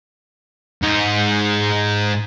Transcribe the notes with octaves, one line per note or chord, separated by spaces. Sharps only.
G#2 D#4